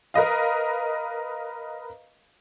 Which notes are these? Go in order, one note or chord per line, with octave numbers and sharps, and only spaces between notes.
A#4 B4 D#5 F5